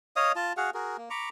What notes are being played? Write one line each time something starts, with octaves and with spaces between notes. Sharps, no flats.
C#5 D#5 F5 D#6
F4 A5
F#4 G#4 F5 F#5
F#4 G#4 A#4
A#3
A#5 B5 C#6 D6